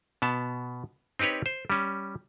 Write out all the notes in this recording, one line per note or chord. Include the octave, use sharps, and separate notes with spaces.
B2 B3 A5
C4 D#4 G4 B4 C#5
C5
G3 C#4